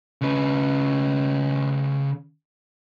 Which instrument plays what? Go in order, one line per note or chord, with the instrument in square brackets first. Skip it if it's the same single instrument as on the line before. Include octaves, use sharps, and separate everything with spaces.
[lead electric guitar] C#3 B4